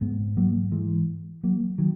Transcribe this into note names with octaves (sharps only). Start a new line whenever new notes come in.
G#2 G#3 B3
F#3 A#3
E3 G#3
F#3 A#3
D#3 F#3